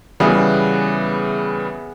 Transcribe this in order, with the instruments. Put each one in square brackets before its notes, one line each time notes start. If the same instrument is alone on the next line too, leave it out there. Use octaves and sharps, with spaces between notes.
[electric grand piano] C#3 E3 G3 [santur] B3 E4 G#4